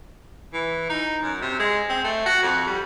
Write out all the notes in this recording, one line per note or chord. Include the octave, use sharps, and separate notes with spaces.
E3
D#4
F#2
C3
G#3
C4
A3
F#4
F2
G3